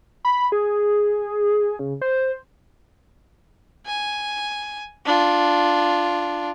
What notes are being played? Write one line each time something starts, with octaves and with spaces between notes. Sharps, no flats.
B5
G#4
C#3
C5
G#5
D4 F4